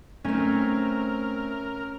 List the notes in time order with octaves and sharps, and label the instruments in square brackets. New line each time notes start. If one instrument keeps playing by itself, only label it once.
[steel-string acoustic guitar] A3 C4 [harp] C#4 [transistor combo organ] A#4